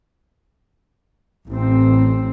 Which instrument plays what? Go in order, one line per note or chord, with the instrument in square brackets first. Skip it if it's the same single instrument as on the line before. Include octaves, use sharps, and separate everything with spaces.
[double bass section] A1 C4